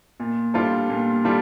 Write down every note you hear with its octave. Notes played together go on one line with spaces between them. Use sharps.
A#2
G3 D4 F4 A4
A#2
G3 D4 F4 A4